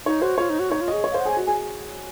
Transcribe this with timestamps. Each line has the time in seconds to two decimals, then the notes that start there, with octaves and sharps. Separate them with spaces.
0.06 D#4 C#5
0.22 F#4 C5
0.38 F4 C#5
0.50 D#4
0.59 F#4
0.71 D#4 C#5
0.81 F4
0.88 G#4 D#5
1.04 C#5
1.11 C5 F5
1.20 F#5
1.25 G#4 G#5
1.37 F#4
1.46 G#4 G#5